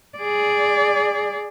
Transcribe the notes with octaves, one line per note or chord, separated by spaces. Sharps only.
G#4 D5